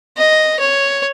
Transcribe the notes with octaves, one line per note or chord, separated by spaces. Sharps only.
D#5
C#5